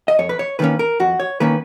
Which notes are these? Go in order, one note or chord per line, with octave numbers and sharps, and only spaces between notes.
D#5
F2 C#5
B4
C#5
D#3 A#3 C#4 B4
A#4
F2 F#4
C#5
D#3 A#3 C#4 B4